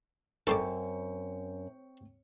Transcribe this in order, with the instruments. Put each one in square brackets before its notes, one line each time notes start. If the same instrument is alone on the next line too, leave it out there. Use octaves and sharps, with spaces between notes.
[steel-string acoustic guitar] F#2 [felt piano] C4 G5 C#6 [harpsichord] A4 C5 D5